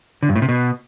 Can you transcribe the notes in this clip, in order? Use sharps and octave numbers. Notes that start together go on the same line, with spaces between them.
D3
G2
A2
C3
B2